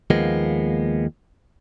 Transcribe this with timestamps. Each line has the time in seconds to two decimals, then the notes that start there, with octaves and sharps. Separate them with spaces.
0.10 D#2 F3 G#3 A#3 B3